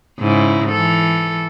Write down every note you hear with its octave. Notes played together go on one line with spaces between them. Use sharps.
G#2 C#3 E4
E3 A4